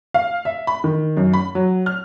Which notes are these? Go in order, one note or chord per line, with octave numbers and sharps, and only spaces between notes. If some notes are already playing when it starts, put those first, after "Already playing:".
F5
E5
B5
D#3
F#2
B5
F#3
F6